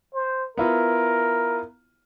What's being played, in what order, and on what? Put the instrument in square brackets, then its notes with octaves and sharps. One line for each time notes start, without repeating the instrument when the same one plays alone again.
[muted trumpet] C5
[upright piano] B3 E4 F4 [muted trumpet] A#4